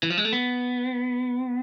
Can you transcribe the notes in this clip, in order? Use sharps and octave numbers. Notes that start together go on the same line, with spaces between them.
E3
F3
G#3
A3
B3